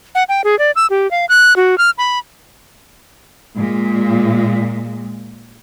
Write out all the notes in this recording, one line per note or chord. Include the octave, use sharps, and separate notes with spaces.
F#5
G5
G#4
D5
E6
G4
F5
F#6
F#4
F6
B5
A#2 G#3